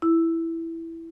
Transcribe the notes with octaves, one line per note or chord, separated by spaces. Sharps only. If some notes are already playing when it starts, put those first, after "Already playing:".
E4